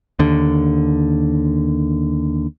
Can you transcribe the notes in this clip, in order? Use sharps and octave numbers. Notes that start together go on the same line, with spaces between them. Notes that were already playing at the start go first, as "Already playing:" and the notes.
D#2 D3